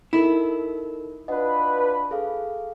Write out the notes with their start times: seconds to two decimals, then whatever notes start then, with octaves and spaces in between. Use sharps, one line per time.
0.13 D#4 E4 A4 A#4
1.28 D4 F4 B4 D#5 F#5
2.11 G#4 A4 F5